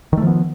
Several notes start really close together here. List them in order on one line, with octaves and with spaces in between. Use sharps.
D#3 A3 F3 B3